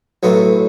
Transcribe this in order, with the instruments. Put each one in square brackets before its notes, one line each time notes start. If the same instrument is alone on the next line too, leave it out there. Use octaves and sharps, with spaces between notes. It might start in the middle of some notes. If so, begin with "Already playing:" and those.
[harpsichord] B1 A2 F#3 B3